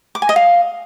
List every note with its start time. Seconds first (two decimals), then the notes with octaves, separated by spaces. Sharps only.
0.15 D6
0.22 G#5
0.29 D#5
0.36 F5